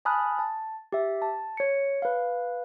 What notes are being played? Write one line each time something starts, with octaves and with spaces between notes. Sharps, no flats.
G#5 A5 B5 D#6 F6 F#6
A5
G4 E5
A5
C#5 C#7
B4 F5